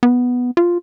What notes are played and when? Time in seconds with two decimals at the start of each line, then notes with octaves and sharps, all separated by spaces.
0.03 B3
0.57 F4